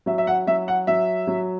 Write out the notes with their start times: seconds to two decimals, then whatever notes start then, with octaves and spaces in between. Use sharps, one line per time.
0.06 F#3 E5
0.18 E5
0.27 F#5
0.47 F#3 E5
0.68 F#5
0.87 F#3 E5
1.27 F#3